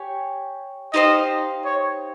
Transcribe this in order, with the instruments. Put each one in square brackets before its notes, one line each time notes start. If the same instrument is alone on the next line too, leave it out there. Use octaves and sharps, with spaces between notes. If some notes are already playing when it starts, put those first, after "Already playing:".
Already playing: [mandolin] G4 C#5 G#5
[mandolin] D#4 G4 C5 F5 [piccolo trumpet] D#5
[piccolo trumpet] C#5